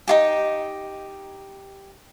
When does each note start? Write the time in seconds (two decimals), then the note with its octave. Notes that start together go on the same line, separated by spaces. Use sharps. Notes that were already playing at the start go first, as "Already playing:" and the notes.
0.08 D#4 F4 G4